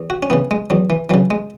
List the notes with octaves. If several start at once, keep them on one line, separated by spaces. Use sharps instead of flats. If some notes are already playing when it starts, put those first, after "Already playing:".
Already playing: E2
F#4
C#4
C#3 E3 B3
G#3
E2 F#3
E3
C#3 E3 F#3
G#3